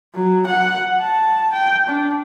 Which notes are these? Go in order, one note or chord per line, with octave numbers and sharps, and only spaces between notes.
F#3
F#5
A5
G5
D4